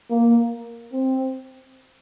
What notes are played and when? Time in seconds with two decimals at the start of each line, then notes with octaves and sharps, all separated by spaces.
0.11 A#3
0.93 C4